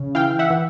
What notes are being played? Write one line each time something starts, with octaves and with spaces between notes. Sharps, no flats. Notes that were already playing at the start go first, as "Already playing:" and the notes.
Already playing: C#3
E3 F5 G5
E5 F#5
E3